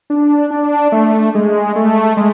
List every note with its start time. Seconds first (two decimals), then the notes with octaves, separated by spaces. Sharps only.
0.10 D4
0.51 D4
0.92 A3
1.35 G#3
1.76 A3
2.17 G#3